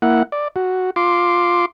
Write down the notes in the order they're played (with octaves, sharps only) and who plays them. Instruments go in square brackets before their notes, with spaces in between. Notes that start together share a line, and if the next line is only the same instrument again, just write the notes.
[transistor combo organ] A#3 E4 F#5
D5
F#4
F4 C6 D6